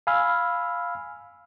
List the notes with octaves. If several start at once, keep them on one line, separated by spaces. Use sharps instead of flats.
F5 G#5 B5 E6 F6